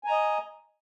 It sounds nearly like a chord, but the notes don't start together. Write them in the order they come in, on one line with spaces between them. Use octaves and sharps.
G#5 A#5 D#5